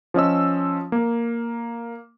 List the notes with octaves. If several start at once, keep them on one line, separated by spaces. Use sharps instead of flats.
F3 C#4 D#5 E6
A#3